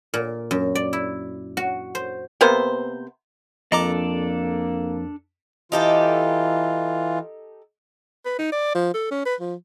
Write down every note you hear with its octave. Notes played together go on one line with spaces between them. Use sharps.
A#2
F#2
D5
E4
F#4
C5
C3 A#3 B3 C5
F2 A#3 D4 A4 D5 D#5 A#5 D6
E3 D#4 F4 G4 A4
B4
D#4
D5
F3
A4
C#4
B4
F3